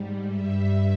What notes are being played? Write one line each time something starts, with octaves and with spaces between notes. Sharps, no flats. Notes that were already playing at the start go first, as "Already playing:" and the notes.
Already playing: G#2 G3
G2 G3 E5